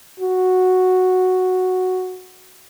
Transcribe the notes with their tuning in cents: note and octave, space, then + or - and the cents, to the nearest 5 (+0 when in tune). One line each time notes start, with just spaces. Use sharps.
F#4 -5